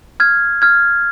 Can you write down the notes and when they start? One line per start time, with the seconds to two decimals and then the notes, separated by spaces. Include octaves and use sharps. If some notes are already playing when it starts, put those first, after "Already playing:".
0.20 F6 G#6
0.62 F6 G#6